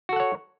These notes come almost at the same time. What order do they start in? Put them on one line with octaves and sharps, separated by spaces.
F#4 A4 F#5 C#5